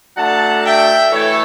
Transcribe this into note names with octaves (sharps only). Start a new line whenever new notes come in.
F#3 A3 D4 F#5 A5
E5 G5
E3 A3 E4 A4 C#5